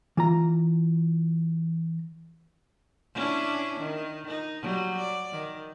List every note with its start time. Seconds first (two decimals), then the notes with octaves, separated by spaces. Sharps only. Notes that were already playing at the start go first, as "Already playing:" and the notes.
0.17 E3 F4 A#5
3.14 C#4 D4 E4
3.80 D#3
4.27 D#4
4.62 F#3 G3
4.97 D5
5.32 D#3